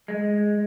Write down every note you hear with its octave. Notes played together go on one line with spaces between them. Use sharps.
G#3